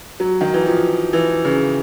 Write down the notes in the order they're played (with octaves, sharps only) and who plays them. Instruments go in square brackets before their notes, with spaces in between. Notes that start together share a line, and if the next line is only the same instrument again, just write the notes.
[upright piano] F#3
D#3
E3
F3
E3
C#3